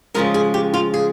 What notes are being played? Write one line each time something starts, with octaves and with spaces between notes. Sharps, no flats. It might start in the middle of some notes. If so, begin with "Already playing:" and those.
C#3 F3 G#3 A#4
G#4
G4
F4
G#4